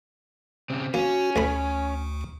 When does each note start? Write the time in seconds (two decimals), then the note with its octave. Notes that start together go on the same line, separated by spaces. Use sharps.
0.70 C#3 C4
0.94 A#3 C#4 F#4
1.36 A1 D2 A3 B5